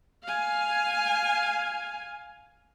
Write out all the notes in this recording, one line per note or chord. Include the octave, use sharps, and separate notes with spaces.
F5 G#5